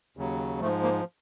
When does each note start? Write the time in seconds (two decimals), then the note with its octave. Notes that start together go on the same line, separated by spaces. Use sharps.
0.17 D#2 C#3 F#3
0.61 G#2 F3 A3
0.83 A#3